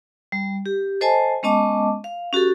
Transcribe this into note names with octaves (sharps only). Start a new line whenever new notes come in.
G3
G4
A4 C5 D#5 G#5 A5
G#3 B3 C#4 D#5 A5 D6
F5
C#4 F#4 G4 A4